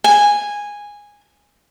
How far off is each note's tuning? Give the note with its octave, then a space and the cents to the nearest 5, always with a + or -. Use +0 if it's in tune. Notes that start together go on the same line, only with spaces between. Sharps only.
G#5 -10